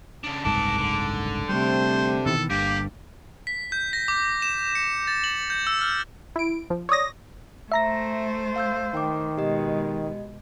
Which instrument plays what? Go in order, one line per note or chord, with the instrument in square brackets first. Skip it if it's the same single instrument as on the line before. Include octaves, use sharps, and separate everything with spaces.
[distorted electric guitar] C#3 D4
[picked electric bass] F#1 C2 G#2 [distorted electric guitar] B4 A5 [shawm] D6
[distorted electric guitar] D3
[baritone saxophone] C3 [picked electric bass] G3 A3 [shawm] C5
[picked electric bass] B2 D#3 E3 [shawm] A4
[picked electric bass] G1 G2 [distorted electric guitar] A#3 [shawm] G4
[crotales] B6
G6
A#6
D6
E7
C#7
A6
F#7
G6
E6
F6
[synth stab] E4 D7
F3
C#5 D5 D#6 A#6
[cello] A3 C5 [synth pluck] E5 A#5 A#6
[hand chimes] F5 E6 G6
[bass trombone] D#3 [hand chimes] G5 D6
[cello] B2 G#3 [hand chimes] G4 D#5